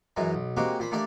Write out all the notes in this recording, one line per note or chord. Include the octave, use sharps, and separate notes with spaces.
F#2 E3 F#3 G#3
B1
G#3 A#3 C4 F#4 G4
A#2 C5 B5
A3 A#3 D4 G4 D5